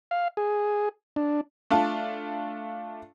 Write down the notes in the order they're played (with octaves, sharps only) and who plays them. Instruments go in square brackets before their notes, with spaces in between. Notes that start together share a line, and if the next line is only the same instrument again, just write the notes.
[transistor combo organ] F5
G#4
D4
[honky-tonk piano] A3 D4 F4